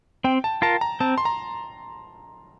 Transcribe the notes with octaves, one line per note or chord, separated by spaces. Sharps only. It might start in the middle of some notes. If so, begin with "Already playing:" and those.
C4 G5
A5
F4 A#4 A5
A#5
C4 A5
C6
A#5